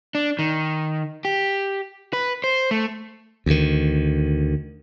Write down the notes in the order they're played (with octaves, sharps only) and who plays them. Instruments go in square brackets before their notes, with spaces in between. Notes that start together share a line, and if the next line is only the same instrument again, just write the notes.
[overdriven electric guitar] D4
D#3
G4
B4
C5
A3
[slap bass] D2 D#3